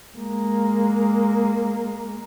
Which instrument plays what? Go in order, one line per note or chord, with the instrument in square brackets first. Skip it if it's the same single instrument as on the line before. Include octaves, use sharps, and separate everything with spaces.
[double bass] G#3 A#3